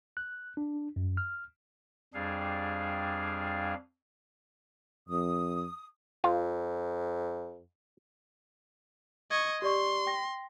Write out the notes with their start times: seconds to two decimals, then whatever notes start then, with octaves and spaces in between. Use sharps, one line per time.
0.17 F#6
0.57 D4
0.96 F#2
1.17 F6
2.14 F2 G3 D4 G#4 F5
5.09 F2 D#6
6.24 F2 F4
9.31 D#5 C#6 G#6
9.62 G4 D5 C6 C#6
10.07 G5 A#6